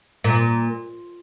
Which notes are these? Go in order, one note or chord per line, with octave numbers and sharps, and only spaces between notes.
A#2